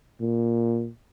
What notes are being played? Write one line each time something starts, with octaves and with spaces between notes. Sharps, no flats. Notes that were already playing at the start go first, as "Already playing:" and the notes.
A#2